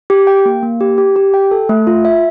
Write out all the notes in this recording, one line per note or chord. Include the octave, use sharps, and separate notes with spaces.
G4
G5
A#3
A#3
G4
G4
G4
G5
A4
A3
F4
E5